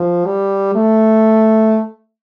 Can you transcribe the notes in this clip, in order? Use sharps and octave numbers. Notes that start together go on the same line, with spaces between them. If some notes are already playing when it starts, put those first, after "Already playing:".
Already playing: F3
G3
A3